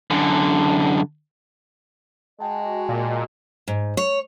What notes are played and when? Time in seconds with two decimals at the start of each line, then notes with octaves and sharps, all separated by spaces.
0.11 F#2 D3
2.40 G#3 F#4 D#5 G5 A5
2.89 A#2
3.68 G#2
3.97 C#5